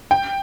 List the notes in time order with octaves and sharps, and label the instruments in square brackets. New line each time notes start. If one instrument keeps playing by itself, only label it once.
[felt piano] G5